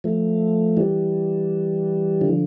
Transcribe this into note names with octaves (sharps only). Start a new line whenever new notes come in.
F3 A3
E3 G3
D3 F3